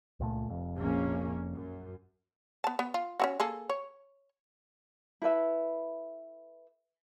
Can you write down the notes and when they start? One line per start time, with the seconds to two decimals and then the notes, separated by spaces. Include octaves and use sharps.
0.20 C#2 A#2 A3
0.48 F1 F2
0.77 A#1 A#3 C#4
1.53 F#2
2.64 B3 A5
2.79 B3
2.94 F4
3.20 C#4 E4 F#4
3.40 A#3 G#4 A4
3.69 C#5
5.22 E4 A4 B4 E5